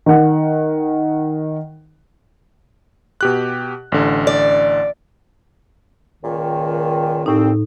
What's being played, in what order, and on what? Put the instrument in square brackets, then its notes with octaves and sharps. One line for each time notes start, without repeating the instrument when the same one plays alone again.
[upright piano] D#3 F#5
[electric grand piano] B2 G4 F#6
A1 D3
[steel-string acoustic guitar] D5
[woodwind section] C#2 A#2 D#3
[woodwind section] C2 C4 [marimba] A2 D#4